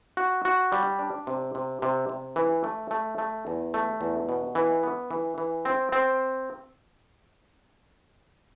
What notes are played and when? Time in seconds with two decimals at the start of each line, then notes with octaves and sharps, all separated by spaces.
0.17 F#4
0.45 F#4
0.72 G3
0.99 D4
1.27 C3
1.55 C3
1.82 C3
2.09 C3
2.36 E3
2.64 A3
2.91 A3
3.18 A3
3.47 E2
3.74 A3
4.01 E2
4.29 B2
4.55 E3
4.83 B3
5.11 E3
5.38 E3
5.65 C4
5.92 C4